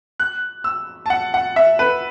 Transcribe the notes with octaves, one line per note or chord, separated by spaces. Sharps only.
F#6
E6
A5
F#5
F#5
E5
B4